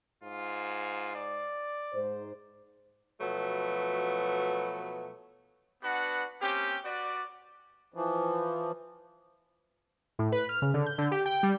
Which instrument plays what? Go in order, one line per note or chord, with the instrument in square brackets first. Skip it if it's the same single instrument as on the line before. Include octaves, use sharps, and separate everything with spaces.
[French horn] G#2 [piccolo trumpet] F4
[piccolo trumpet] D5
[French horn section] G#2 C5
[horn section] B2 F3 F#3 A3 B3
[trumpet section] B3 D4 F#4 B4 F#5
A#3 C4 C#4 G4
F#4 B4 D5
[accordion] E3 F3
[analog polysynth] A2
B4
F6
C#3
D3
G6
D3
G4
G5
G3